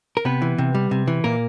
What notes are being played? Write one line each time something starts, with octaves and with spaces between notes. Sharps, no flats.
A#4
C3 B3 B4
E3
C3
G3
C3
E3
A#2 A#3 A#4